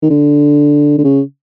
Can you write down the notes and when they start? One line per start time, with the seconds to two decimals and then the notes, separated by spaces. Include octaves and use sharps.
0.02 D#3
0.10 D3
0.98 D3
1.04 C#3